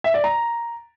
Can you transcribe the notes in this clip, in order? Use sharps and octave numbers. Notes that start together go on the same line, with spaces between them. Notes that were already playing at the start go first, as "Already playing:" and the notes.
E5
D5
A#5